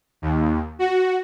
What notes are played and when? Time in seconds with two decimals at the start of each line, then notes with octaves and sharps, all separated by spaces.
0.22 D#2
0.79 F#4